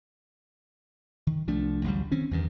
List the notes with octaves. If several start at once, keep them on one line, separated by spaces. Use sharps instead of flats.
D#3
C2 F3 A3 D4
A1 D2 F#3 G3
D#3 C4 C#4
E2 G2 D#3